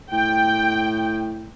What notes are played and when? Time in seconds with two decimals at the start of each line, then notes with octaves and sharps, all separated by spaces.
0.12 A2 G5